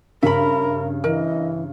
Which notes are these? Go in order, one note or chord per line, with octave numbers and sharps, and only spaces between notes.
G2 C#3 A#4 E5 B5
E3 A#4 D#5